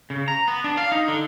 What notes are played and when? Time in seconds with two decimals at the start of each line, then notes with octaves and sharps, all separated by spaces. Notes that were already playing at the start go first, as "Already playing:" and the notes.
0.10 C#3
0.28 A#5
0.48 B3
0.64 D4
0.77 F5
0.92 D#4
1.08 D3